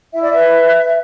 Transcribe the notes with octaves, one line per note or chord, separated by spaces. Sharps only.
E4 E5
D5
B4 E5